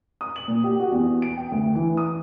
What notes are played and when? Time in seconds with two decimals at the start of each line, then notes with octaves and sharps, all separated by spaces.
0.21 D#6
0.36 F#7
0.48 A#2
0.64 G4
0.80 F#4
0.92 E2
1.22 D7
1.37 G5
1.52 D2
1.75 E3
1.97 D#6